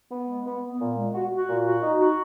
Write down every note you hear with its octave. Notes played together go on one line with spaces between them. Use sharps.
B3
G#3
B3
B3
A#2
G#3
F#4
F#4
A#2
F#4
D#4
F#4